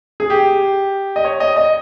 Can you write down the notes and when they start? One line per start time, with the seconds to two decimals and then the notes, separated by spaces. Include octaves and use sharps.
0.20 G#4
0.30 G4
1.16 D#5
1.25 C#5
1.40 D#5
1.56 D#5